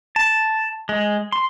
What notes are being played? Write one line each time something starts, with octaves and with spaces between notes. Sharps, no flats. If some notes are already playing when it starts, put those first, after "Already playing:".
A5
G#3
C6